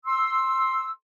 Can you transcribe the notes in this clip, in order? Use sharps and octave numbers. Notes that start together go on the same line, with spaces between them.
C6 E6